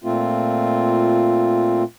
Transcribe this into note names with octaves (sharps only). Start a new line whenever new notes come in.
A#2 A3 C4 F4